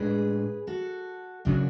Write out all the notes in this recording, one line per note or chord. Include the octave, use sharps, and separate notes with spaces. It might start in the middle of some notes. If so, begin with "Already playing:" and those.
Already playing: A2 G#3 D4 G#4 B4
F#4 A4
C#3 F#3 D4 F#4